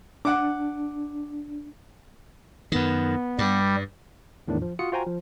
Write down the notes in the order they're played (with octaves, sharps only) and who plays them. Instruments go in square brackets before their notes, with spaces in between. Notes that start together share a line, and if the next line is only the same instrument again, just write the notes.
[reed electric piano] D4 [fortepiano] F#5 D6
[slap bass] F#2 D#3 [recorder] B3
[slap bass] G2 [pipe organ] G3
[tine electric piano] E2 A2 D#3 D4
F3
F4 F#4 D#6 C#7
F4 F#4 C5 G5 G#5 A#5
F3